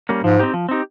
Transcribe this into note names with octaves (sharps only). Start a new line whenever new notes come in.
G3 A#3 C#4
G#2 F3
C4 D#4 G4
F3
C4 D#4 G4